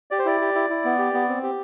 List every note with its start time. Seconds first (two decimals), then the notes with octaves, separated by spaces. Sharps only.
0.11 G4 D5
0.19 C5
0.26 E4 D5
0.41 G4
0.55 E4
0.70 E4
0.85 B3
0.99 G4
1.14 B3
1.29 C4
1.43 G4